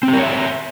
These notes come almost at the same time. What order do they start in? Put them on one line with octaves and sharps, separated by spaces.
C4 G4 A#4 C#5 E5